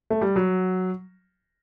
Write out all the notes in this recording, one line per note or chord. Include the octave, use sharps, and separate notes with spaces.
A3
G3
F#3